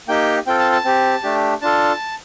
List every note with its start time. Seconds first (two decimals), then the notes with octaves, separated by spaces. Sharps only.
0.08 A#3 D#4 G4 G5
0.47 C4 F4 A4 G5
0.59 A5
0.72 A5
0.85 C4 G4
1.23 A3 D4 G4
1.61 D4 F4 A4 A5